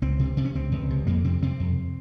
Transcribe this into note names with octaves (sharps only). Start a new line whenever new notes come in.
C#2 C4
C3
C3
C#4
C#2 C4
C#2
C3
F2 A#3
C3 C4
C3 C4
F2